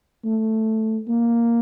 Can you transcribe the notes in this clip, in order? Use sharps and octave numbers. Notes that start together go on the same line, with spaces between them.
A3
A#3